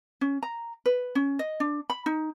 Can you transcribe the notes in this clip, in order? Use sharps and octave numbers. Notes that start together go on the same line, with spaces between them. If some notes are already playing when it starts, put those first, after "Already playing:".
C#4
A#5
B4
C#4
D#5
D4
B5
D#4